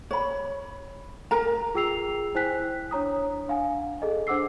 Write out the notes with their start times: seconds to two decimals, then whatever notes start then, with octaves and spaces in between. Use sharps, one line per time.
0.11 C#5 B5
1.31 A#4 A#5
1.75 F4 G#4 G5 E6 C7 F7
2.35 E4 C5 G5 G#5 F#6 B6
2.91 D4 C#5 A#5 D#6
3.48 D4 F5 F#5 G#5
4.02 G#4 A4 D#5
4.27 D4 C5 F#5 D6 E6 C7